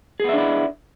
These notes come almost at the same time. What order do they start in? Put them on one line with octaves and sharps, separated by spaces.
G#4 B3 E5 D4 E4